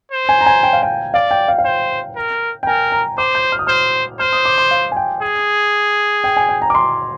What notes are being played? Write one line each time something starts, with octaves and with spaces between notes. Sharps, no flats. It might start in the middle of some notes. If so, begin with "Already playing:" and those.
C5
G#5
A#5
G#5
G5
F5
G5
D5 F5
G5
F5
F5
C5 G5
A#4
G5
A#4 G#5
A#5
C5 D6
G6
F6
D#6
C5 F6
C5 F6
D#6
D6
C6
F5
G#5
G5
G#4
G5
G#5
G5
A#5
D6
C6